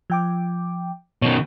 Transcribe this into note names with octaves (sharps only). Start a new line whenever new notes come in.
F3 G5 D6
B2 D#3 C#5